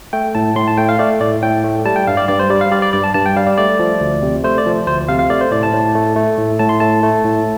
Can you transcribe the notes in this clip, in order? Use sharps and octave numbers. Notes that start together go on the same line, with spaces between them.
A3 G5
A2 A5
A2 C6
A5
A3 G5
F5
A3 D5
A2 D5
A2 G5
A3
G3 A5
G5
G2 F5
D5
G2 D5
C5
G3 D5
F5
G3 D5
D5
G2 D5
A5
G2 A5
G5
G3 F5
D5
A3 D5
F3
D2
C3
A3 C5
D5
F3
D2 C5
C3 F5
F5
A3 D5
C5
A2 D5
A5
A2
A3
A3
A2
A2 A5
C6
A3 A5
A3
A2